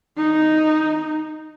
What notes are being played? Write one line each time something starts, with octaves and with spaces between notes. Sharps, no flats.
D#4